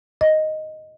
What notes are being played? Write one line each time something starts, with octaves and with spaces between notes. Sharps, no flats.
D#5